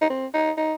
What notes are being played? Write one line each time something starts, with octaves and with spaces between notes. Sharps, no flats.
D#4
C4
D#4
D#4